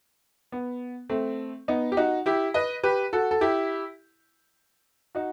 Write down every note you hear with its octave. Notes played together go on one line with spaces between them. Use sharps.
B3
A3 C4
B3 D#4
G4
D#4 F#4
E4 G4
B4 D#5
G4 B4
F#4 A4
A4
E4 G4
D#4 F#4